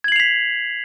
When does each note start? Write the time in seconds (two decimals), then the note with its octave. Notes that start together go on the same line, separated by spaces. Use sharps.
0.04 G#6
0.08 F#7
0.12 C7
0.16 F7
0.20 B6